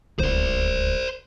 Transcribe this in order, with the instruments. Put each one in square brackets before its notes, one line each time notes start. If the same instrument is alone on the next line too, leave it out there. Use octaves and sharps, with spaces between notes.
[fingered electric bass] D1 [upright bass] C#2 [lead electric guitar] C5 D5